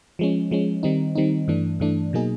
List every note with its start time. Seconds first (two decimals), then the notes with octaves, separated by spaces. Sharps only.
0.19 F3 G#3 C#4
0.51 F3 G#3 C#4
0.83 D#3 G3 C4 D#4
1.15 D#3 G3 C4 D#4
1.48 G2 E3 A3 D4
1.80 G2 E3 A3 D4
2.13 B2 F#3 A#3 D#4 G#4